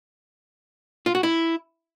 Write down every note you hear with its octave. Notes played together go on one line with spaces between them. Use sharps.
F4
F#4
E4